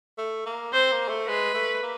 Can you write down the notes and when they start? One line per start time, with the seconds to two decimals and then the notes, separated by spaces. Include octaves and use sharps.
0.18 A3
0.46 A#3
0.72 C4 C5
0.92 A#3
1.09 A3
1.28 G#3 B4
1.54 A3
1.83 A#3